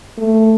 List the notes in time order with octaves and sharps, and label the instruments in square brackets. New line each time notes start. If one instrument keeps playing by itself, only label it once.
[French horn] A3